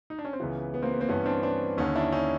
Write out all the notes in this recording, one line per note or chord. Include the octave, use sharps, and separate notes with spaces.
D#4
D4
C#4
C4
C#2 C#3 E3 B3
B3
A#3 C4
B3
A#3 C4
G2 E3 B3 C#4
C4 D4
C4 D4
D#2 D3 C#4 D#4
D4 E4
C#4 D#4